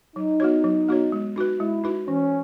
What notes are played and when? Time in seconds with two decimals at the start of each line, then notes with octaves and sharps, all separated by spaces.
0.16 F#3 D#4
0.40 B3 F#4 C#5
0.64 F#3
0.88 B3 F#4 C#5
1.12 G#3
1.36 D#4 F#4 B4
1.60 G#3 E4
1.84 D#4 F#4 B4
2.08 E3 C#4